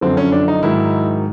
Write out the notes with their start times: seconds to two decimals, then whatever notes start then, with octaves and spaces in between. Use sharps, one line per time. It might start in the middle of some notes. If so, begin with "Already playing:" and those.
0.01 F#2 D3 F3 C4
0.17 C#4
0.32 D4
0.48 D#4
0.63 G#2 D#3 F#3 E4